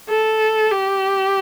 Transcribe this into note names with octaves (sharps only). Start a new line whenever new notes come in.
A4
G4